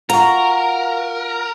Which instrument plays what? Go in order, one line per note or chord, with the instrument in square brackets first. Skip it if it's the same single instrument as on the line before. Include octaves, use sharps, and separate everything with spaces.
[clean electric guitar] F4 F#4 [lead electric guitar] A#4 [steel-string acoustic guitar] A#5